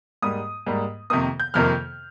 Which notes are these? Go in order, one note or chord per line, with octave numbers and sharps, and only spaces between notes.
G#2 G3 A#3 D#6
G#2 G3 A#3
F2 C3 D#3 A#3 D#6
G6
F2 C3 D#3 A#3 F6